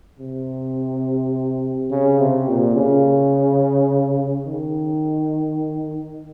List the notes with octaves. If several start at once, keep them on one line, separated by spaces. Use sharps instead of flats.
C3
C#3
C3
A#2
C#3
D#3